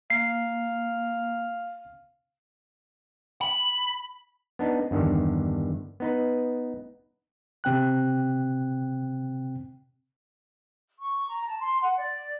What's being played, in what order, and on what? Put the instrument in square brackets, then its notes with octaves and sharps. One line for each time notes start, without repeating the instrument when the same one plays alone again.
[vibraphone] A#3 [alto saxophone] F5 [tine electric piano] C7
[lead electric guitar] B5
[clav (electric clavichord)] B3 D4 D#4
E2 G2 D3 D#3
B3 D#4 B4
[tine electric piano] C3 C4 G5 F#6
[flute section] C#6
A#5
A5
C6
F#5
D5